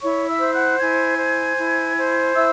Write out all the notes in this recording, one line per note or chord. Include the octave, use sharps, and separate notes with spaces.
E4 C#5 C#6
E5 E6
C5
F#5 F#6
E4 G#5 G#6
C5
E4
C5
E4 E5 E6